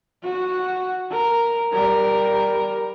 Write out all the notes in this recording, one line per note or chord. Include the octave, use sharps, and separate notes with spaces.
F#4
A#4
G3 A#4